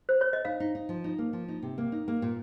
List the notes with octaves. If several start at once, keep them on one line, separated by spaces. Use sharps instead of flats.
C5
C#5
D#5
D#4 F5
D#4
D#4
F3
D#4
A#3
F3
D#4
C3
A#3
D#4
A#3
A#2